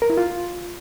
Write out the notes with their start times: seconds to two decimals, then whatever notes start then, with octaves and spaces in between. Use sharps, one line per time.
0.02 A#4
0.10 E4
0.17 F4